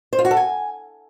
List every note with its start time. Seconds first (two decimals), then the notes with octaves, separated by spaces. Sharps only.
0.13 C5
0.19 F4
0.25 F#4
0.31 A4
0.37 G#5